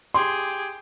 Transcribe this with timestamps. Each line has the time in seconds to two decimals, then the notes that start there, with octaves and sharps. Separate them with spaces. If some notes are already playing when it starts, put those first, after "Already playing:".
0.14 G4 G#4 C6